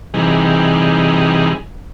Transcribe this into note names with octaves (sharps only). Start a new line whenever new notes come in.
C3 E3 G3 D#4 G#4